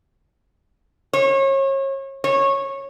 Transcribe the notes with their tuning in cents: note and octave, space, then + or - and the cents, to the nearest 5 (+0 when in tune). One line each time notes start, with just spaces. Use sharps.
C#5 -35
C#5 -15